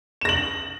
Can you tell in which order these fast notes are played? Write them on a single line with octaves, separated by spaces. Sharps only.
E7 A#6 F#7